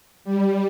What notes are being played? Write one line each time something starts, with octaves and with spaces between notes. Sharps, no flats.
G3